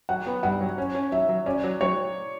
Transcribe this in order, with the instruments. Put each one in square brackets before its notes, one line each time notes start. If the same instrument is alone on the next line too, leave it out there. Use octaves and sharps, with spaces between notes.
[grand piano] F#3 [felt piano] F#5
[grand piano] B3
[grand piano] G2 [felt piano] F#5
[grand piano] F#3
C#4
C#4
[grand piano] F#3 [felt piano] E5
[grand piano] F#3
[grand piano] C#4 [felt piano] D5
[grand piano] F#3
[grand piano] F#3 [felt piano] C#5